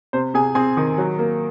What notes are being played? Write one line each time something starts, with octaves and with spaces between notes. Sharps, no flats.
C3 C5
C3 G#4 G#5
C4 G#4 G#5
D#3
F#3
A#3